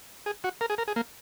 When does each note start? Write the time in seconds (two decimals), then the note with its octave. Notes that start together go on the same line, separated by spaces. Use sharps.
0.26 G#4
0.44 F#4
0.61 A#4
0.70 G#4
0.78 A#4
0.88 G#4
0.96 A#3